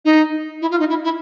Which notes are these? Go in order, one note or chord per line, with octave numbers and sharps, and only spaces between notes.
D#4
E4
F4
D#4
E4
E4